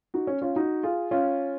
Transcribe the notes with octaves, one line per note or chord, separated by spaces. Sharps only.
D#4 F#4
C#4
C#4 F4
D#4 F#4
F4 G#4
C#4 F4